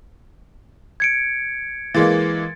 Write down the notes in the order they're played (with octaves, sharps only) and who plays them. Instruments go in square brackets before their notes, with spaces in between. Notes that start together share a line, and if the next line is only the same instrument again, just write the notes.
[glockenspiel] G#6 C#7 D7
[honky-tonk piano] E3 G#3 A#3 [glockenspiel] A6